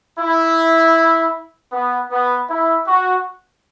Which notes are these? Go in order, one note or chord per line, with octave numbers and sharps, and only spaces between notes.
E4
B3
B3
E4
F#4